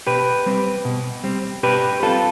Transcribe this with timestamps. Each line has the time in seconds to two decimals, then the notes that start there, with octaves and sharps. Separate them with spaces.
0.07 B2 G4 B4
0.46 G3 C4
0.85 B2
1.24 G3 C4
1.63 B2 G4 B4
2.02 G3 C4 F4 A4